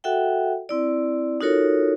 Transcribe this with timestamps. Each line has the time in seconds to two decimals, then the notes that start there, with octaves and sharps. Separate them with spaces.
0.04 F#4 A4 E5 F#5 G5
0.69 C4 E4 D5
1.41 D#4 F4 F#4 A4 A#4 C#5